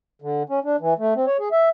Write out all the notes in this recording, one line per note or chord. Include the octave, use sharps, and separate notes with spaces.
D3
C#4
D4
E3
A3
C4
C#5
G#4
E5